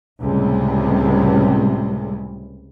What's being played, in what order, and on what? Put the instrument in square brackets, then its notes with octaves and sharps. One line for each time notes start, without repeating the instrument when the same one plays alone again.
[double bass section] C#2 A2 C3 G3 G#3